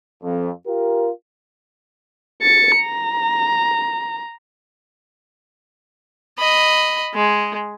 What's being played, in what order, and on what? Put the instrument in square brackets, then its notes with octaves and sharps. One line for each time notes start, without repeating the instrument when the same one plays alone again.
[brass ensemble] F2
F4 G4 A#4
[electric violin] A6 C#7
A#5
[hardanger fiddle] D#5 B5
G#3